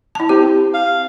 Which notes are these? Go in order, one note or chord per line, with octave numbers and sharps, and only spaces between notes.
E4 A5
C4 G4
F5